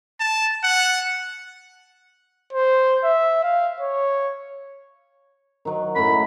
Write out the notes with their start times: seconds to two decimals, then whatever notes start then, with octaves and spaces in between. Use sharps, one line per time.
0.20 A5
0.63 F#5
2.53 C5
3.04 E5
3.44 F5
3.81 C#5
5.65 D#3 F#3
5.96 F#2 A2 B5